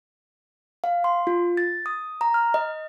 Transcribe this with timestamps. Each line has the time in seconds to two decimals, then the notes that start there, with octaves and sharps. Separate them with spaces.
0.84 F5
1.04 C6
1.27 F4
1.57 A6
1.86 D#6
2.21 A#5
2.34 F6
2.54 D#5